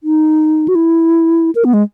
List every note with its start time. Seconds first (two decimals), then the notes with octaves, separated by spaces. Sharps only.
0.03 D#4
0.68 F#4
0.75 E4
1.55 A#4
1.65 B3
1.74 G#3